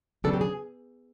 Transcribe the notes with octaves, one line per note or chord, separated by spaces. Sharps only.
C#3 F#3 B3 D4 A4
G4
G#4